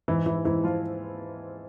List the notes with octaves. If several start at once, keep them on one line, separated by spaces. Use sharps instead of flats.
G#2 E3 E4
E3 E4
G#2 E3 E4
F3 F4